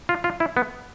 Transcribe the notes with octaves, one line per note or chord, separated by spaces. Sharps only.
F4
F4
E4
B3